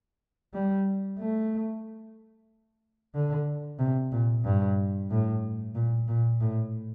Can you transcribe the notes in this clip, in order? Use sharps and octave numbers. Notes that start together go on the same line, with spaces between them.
G3
A3
D3
C3
A#2
G2
A2
A#2
A#2
A2